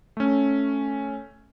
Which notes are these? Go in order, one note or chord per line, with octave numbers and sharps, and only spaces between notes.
A3 C#4